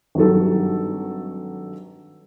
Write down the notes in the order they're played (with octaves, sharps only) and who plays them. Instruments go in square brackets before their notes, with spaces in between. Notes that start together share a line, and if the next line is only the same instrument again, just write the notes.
[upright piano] G#1 G2 F#3 A4